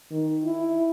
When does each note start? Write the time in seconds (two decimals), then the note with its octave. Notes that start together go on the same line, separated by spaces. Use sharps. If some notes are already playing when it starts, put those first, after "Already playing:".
0.11 D#3
0.44 E4